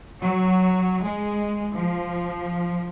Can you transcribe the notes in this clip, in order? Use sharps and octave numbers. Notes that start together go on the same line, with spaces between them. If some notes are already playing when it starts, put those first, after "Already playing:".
F#3
G#3
F3